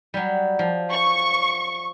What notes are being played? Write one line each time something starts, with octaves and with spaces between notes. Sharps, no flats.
F#3 G3
F3
C#6